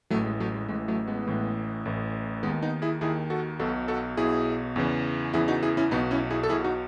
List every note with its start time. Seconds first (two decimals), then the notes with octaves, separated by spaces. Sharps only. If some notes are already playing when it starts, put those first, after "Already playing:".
0.10 A1 A2 E3 F#3 A3
0.25 G#3
0.40 F#3 A3
0.55 G#3
0.69 A1 A2 E3 G#3
0.88 F#3 A3
1.07 G#3 B3
1.27 A1 A2 E3
1.85 A1 A2 E3
2.43 D#3 G#3 B3
2.47 D#2
2.62 B3 D#4
2.82 E4 G#4
3.01 D#2 D#3 E4 G#4
3.30 F#4 A4
3.59 B1 B2 F#4 A4
3.88 F#4 A4
4.17 B1 B2 E4 G#4
4.76 E2 C#3 E3
5.33 E2 C#3 E3 E4 G#4
5.48 D#4 F#4
5.63 E4 G#4
5.77 C#4 E4
5.91 B1 B2 B3 D#4
6.11 C#4 E4
6.30 E4 G#4
6.43 A4
6.49 B1 E4 G#4
6.52 B2
6.64 D#4 F#4